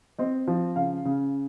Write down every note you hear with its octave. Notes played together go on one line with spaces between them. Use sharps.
C4 D#5
F3
C#3 F5
C#3